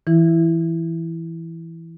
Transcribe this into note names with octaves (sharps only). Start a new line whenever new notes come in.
E3 E4